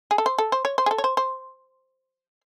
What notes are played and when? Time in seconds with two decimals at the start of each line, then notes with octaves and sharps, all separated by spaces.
0.11 G#4
0.18 A4
0.26 C5
0.38 A4
0.52 C5
0.65 C#5
0.78 C5
0.86 G#4
0.91 A4
0.98 C#5
1.04 C5
1.17 C5